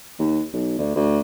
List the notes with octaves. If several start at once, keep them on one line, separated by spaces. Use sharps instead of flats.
D#2
B1
D2
D2